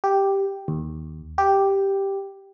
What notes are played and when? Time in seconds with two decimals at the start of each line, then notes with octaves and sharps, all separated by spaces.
0.04 G4
0.68 D#2
1.38 G4